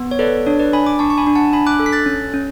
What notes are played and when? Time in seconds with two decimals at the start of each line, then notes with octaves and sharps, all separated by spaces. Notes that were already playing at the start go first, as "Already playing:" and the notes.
Already playing: B3
0.11 C#5
0.19 A4 B4 D5
0.46 D4 C#5
0.59 B4 D5
0.73 D4 G#5 B5
0.86 B5 D6
0.99 D4 A5 C#6
1.10 C#6
1.18 G#5 B5
1.27 D4
1.35 F#5 A5
1.53 D4 G#5 B5
1.67 D6 F#6
1.80 A4
1.86 B6
1.93 F#6 A6
2.06 C#4
2.34 C#4